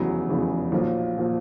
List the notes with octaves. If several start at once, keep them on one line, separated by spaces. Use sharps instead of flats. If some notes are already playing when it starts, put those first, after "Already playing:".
Already playing: F1 E2 C#3 F#3 B3
F1 E2 C#3 F#3 B3
B1 A#2 F3
A#2 F3